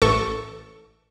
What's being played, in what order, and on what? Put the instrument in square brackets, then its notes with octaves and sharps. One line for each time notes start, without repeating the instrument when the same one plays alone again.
[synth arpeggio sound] A1 A4 C#6